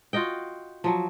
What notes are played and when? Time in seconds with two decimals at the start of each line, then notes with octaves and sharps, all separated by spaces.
0.13 F4 F#4 D#5 G5
0.84 F3 F#3